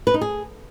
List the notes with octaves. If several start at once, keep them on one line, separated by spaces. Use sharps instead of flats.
B4
D#4
G#4